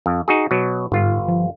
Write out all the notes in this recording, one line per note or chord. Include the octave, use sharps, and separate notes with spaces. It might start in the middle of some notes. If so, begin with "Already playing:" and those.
F2
D#4 F#4 G#4
B2 F#3
G1 G#2 F4
F3